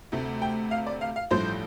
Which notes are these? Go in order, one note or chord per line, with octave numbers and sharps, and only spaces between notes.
D2 C3 A3
G5
F5
D5
F5
F5
A1 G2 F3 A3 C5